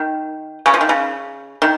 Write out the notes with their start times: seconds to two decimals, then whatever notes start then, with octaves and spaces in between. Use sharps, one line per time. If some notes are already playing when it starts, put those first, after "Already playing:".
Already playing: D#3
0.66 C#3 C#4
0.74 F3
0.81 D#3
0.89 C#3
1.62 D#3